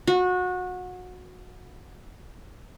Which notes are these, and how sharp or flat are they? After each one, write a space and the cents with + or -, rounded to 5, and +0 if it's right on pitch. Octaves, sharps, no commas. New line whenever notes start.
F#4 -25